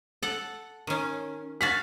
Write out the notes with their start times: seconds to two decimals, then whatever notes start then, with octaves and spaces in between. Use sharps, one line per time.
0.23 A4 F#5
0.87 D#3 C#4
1.61 F#4 F5 F#5 A6 B6